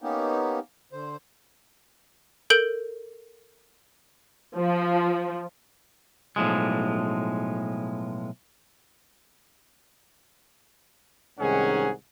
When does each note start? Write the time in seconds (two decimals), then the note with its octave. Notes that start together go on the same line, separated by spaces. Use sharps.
0.02 A#3 B3 C#4 D#4 G4
0.92 D3 C5
2.50 A4 A#4 G6 D7 F#7
4.56 F3
6.36 B1 A2 F3 G#3
11.40 C2 G#2 D#3 C#4 G#4 F#5